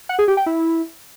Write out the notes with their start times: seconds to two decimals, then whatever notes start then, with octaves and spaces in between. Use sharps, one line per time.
0.09 F#5
0.19 G#4
0.28 G4
0.37 G5
0.46 E4